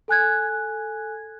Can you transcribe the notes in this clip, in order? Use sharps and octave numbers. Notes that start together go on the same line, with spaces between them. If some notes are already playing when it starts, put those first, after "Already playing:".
A4 G#5 F#6 G#6